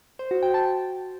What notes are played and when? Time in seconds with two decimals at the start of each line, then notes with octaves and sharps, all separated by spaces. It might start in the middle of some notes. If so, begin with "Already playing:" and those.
0.19 C5
0.31 F#4
0.43 G5
0.54 A5